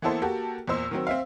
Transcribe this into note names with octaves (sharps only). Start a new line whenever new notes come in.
E3 A#3 B3 E4 A4 C5
A#3 F#4 G4 A4
E2 A#2 C5 E6
D#3 F#3 C4
C4 E5 F5